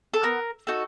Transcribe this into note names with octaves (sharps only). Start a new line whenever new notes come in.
A4
B3 A#4
D#4 F#4 A4